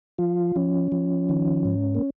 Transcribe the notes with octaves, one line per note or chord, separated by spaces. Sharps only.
F3 F4
F3 C#4
F3
D#3
G#2
A#3